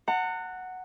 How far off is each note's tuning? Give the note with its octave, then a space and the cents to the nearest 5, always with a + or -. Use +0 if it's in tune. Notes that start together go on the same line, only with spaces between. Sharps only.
F#5 +0 A#5 -45